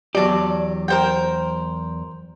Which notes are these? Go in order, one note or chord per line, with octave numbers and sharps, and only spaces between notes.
E2 F#3 G4 D5 A5
A#4 C5 G5